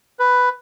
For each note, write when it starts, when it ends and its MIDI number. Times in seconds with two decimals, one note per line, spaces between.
0.19 0.49 71